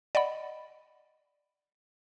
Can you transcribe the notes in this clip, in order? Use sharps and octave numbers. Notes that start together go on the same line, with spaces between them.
D5 D#5 F#5 B5